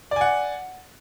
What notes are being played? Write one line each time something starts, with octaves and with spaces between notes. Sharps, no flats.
D5 F#5 G#5